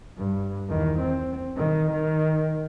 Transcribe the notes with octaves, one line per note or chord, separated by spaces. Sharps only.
G2
E2 D#3
C4
D#3
D#3